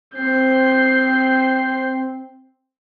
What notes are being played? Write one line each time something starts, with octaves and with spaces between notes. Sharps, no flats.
C4 G6 C7